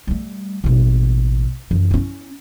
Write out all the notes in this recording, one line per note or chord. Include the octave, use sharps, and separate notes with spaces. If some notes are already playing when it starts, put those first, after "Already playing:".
G3 A3
A1 B2
F#2 E3
C#4 E4